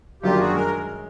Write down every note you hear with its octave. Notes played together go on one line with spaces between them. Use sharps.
F#2 D#3 F#3 A#3 D4 F4 G4
F#4 G#4
G#3 A#4